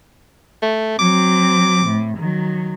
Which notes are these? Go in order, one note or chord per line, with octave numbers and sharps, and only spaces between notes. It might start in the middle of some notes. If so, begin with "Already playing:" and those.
A3
F#3 C4 D6
A2
D#3 F#3